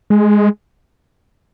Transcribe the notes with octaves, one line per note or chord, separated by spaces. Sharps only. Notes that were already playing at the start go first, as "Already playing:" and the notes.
G#3